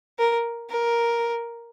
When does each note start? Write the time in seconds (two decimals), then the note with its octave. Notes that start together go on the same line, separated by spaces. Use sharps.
0.19 A#4
0.69 A#4